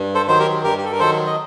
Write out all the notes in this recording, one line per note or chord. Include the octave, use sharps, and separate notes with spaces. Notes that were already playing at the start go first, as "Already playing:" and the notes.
Already playing: G2
A4 C5
D#3 F#3 C5
G4 A#4
G2 G4 A#4
G4
A4
A#4
D#3 F#3 A4 C5
D#5